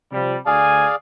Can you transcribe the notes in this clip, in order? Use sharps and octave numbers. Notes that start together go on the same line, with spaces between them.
C3 F3 G3
D2 G#4 D5 F5 G#5